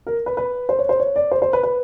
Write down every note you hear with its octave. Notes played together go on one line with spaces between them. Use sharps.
A#4
B4
B4
C5
C#5
C5
C#5
D5
C5
C5
B4
B4